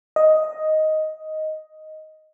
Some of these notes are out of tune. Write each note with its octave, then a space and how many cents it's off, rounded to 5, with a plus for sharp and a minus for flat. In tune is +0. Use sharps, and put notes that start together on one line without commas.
D#5 +5